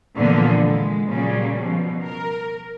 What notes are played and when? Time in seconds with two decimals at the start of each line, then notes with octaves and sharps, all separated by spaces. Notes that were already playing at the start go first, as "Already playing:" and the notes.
0.15 A#2 D3 E3 F3 A#3 B3
0.65 G#3
1.08 A#2 C#3 F#3 G3
1.58 B2 F3
2.03 A#4